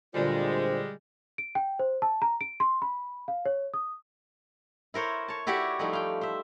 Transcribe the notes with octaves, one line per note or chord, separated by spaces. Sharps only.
D2 A#2 G3 G#3 C4 D4 F4 C5
D7
G5
C5
A5
A#5
D7
C6
B5
F5
C#5
D#6
E4 A#4 C5 C#5
C#5 A5
E4 F#4 G4 C#5 D5 E5
F3 G3 A3 D#4 E4
F5 G5
C5 E5